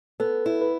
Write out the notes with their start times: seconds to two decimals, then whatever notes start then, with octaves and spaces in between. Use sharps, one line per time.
0.20 B3 A4
0.46 E4
0.62 B4